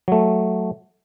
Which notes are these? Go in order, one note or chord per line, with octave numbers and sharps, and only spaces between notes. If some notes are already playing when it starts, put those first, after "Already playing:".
F#3 A3